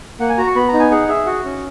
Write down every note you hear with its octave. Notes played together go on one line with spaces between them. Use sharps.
A#3 F#5
G#5
F#4 A#5
C#6
B3 B5
A#5
D#4
G#5
G#4 F#5
G#4 E5
F#4 F#5
C#4